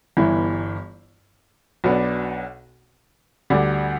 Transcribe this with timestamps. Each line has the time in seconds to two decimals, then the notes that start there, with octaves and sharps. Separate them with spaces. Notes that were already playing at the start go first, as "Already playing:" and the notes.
0.17 G1 G2 E3 B3 E4
1.84 B1 B2 B3 D4
3.50 D2 D3 G3 D4